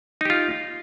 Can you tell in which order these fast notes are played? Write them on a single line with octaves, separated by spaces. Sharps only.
D#4 G4 F4